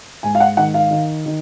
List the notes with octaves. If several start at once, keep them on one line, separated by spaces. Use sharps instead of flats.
G#2 G#5
F5
F#5
D#3 F#5
F5
D#3
D#3